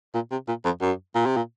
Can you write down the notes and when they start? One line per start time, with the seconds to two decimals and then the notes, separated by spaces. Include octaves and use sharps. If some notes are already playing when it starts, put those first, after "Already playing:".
0.14 A#2
0.31 C3
0.48 A#2
0.65 F2
0.82 F#2
1.15 A#2
1.26 C3
1.37 A#2